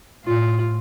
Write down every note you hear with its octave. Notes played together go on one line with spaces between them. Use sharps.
A2 F4